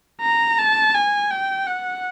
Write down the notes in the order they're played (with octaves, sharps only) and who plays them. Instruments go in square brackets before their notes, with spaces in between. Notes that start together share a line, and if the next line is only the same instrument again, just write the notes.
[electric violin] A#5
A5
G#5
G5
F#5